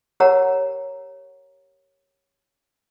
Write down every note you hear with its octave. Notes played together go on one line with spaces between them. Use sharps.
G4 A#4 C#5 F#5 A#5